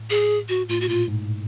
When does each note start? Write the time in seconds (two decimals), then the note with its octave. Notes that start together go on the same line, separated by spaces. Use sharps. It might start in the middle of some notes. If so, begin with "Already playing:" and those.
Already playing: A2
0.10 G#4
0.49 F#4
0.69 A2 F4
0.81 F#4
0.88 A#2 F4
1.08 G#2